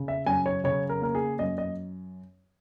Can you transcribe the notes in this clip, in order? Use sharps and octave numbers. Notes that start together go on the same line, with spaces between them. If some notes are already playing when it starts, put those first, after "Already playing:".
Already playing: C#3
E5
F#2 G#5
C#5
C#3 C#5
A#4
A#3 A#4
G#4
F#2 D#5
D#5